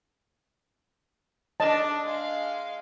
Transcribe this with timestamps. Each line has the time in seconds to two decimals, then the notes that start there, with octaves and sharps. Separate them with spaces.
1.60 D4 D#5 A5
2.06 G#3 F5